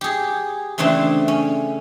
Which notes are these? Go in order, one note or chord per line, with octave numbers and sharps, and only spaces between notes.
G4 G#4
C#3 E3 A3 C4 D4
C#4